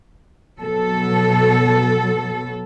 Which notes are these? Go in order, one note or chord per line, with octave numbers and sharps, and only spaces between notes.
B2 F#3 A4